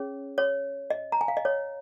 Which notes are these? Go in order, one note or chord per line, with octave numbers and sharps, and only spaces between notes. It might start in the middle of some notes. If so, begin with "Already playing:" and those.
Already playing: C#4 G#4 C#5
C#5
D#5
A#5
G#5
F5
D#5
C#5